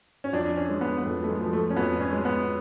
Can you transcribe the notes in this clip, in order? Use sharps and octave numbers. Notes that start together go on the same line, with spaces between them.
C#4
F2 D4
C#4
G#3
B3
B3
F2 A3
A3
G#3
F3
A3
C#4
F2 B3
C#4
G#3
B3